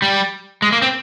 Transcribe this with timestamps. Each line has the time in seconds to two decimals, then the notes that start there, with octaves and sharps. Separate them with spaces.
0.02 G3
0.62 G#3
0.72 A#3
0.82 C4